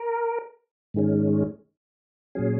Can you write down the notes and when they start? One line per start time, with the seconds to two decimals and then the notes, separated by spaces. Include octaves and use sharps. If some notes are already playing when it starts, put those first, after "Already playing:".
Already playing: A#4
0.94 G#2 D#3 G#3 C#4
2.35 A#2 F#3 C#4 G#4